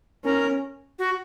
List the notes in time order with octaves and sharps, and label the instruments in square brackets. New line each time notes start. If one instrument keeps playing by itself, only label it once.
[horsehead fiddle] C#4 [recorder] A#4
[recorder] F#4